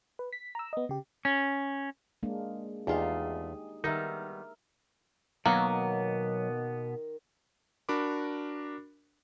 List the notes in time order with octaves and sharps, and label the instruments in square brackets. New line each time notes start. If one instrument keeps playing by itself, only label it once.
[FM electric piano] B4
B6
A#5 E6
B3 D#5
C#3 G4
[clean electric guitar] C#4
[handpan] G#3 A#3 D4
[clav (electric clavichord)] E2 [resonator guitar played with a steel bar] A3 F4 F5 [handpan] D#4 G4 G#4
[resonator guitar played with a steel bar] D#3 G3 B3 [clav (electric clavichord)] D#4 [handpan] A#4 E5
[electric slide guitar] B2 B3 [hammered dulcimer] D#3 [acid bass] F#3 [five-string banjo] A#3
[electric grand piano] D4 F#4 A#4 B5 D6